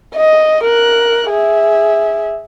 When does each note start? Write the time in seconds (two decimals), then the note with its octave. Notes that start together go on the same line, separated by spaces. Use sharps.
0.16 D#5
0.64 A#4 F#6
1.30 G#4 E5